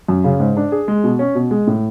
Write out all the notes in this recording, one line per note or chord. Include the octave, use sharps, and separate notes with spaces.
F#2
C#3
G#2
D4
G#4
G#3
B2
C#4
B2
G#3
A2